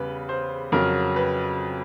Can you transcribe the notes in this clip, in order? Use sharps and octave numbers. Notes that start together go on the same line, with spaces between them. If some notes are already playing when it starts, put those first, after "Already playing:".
Already playing: E2 C#3 G3 B4
C5
F2 C#3 F#3 A#4
B4